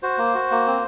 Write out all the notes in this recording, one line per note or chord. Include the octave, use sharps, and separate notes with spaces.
F#4 C5
A#3
F#4
A#3
C4